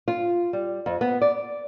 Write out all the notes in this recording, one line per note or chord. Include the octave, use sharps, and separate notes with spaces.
F4
G3
F2
B3
D5